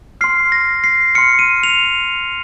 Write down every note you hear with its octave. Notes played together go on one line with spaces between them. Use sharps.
C6 F6 C7
A#6
C7
C6 F6 C#7
D#7
F7